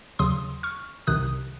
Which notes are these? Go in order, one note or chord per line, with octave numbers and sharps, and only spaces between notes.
D#2 C#3 F#3 C6 D#6
C#6 F6
C2 C3 D#3 D#6 F#6